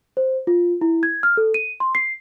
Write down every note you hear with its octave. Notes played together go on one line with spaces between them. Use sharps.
C5
F4
E4
G#6
F6
A4
D#7
C6
C7